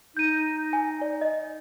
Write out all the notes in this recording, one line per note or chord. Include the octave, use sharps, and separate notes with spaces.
D#4 G6 D#7
G#5
D5
D#5